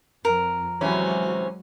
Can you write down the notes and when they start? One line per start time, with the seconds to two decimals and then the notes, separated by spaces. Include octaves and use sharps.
0.25 F2 A#4
0.81 C3 E3 F#3 G#3 C#4 F#4